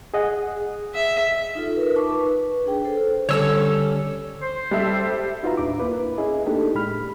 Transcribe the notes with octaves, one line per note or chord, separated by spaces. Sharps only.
G#4 D#5 F#5
E5
D#4 F4 A4
A#4 B4
D#4 A5 C#6 D6
B4
D4 G#4 G5
A4 C5
D3 G3 C#4 A4 C#5 E6
C5
G3 A4 E5
D#4 F4 F#4 B4 E5 A#5
D#2 A2 D4 D6
A#3 E4 B4
C#4 E4 G#4 D#5
A3 A#3 D4 D#4 G4 A4
A2 G#3 B5 F6